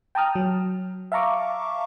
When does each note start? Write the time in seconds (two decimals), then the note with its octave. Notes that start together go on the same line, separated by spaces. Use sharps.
0.15 G5 A5 A#5 D#6 F6
0.35 F#3
1.12 E5 F5 A5 A#5 C#6 D6